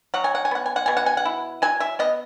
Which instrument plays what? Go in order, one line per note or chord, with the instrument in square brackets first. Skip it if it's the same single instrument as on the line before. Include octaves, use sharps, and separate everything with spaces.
[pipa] F#3 F#5
G#5
F#5
G#5
B3 F#5
G#5
F#5
B2 G#5
F#5
G#5
F#5
E4
F#3 G#5
E5
B3 D#5